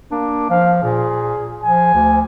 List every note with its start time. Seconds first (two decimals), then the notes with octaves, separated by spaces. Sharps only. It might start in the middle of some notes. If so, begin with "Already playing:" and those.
0.12 A#3 D4
0.50 F3 F5
0.83 A#2 G#4
1.63 F3 G#5
1.94 D2